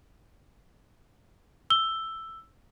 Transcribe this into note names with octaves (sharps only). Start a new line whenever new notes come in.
E6 G7